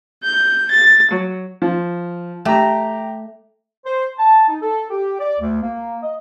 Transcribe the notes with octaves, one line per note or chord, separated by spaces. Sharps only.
G6
A6
F#3
F3
A3 G4 A#5
C5
A5
D#4
A4
G4
D5
D2
A#3
D#5